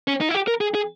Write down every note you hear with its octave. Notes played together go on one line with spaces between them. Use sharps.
C#4
D#4
E4
G4
A#4
G#4
G#4